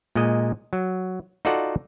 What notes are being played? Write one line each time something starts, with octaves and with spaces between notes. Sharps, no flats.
A#2 G#3 D#5
F#3
D#4 F4 F#4 A4 D5 F#5